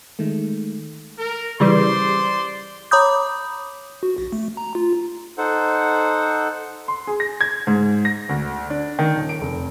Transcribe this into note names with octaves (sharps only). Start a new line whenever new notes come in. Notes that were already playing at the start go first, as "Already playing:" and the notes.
D#3 G#3 A3
A#4
C#3 E3 G3 C5 D5 C6
C#5 A#5 B5 D6 D#6 G6
F#4
A#1
A3
A#5
F4
D#4 A4 C5 F#5
C6
G#4
A#6
G#6
G#2
A#6
D2
D4
D#3
D#1
D7
F1